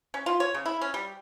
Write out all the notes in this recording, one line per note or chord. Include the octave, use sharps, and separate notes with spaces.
C#4
F4
C#5
C#3
E4
C#4
G3